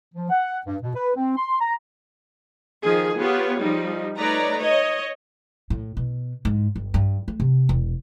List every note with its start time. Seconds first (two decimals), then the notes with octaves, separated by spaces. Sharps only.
0.15 F3
0.30 F#5
0.66 G2
0.83 B2
0.95 B4
1.16 C4
1.37 C6
1.60 A#5
2.82 D#3 F3 G#4
3.18 B3 F4 G4 G#4 C#5
3.60 F3 G3 D#4
4.15 A3 D#4 B4 C#5 D5 A#5
4.58 C#5 D#5
5.70 A2
5.97 B2
6.45 G#2
6.76 G1
6.94 G2
7.28 A3
7.40 C3
7.69 E1